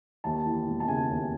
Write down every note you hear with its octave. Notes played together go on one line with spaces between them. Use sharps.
D#2 A5
E3
E1
A5
C#3 G#5
D#2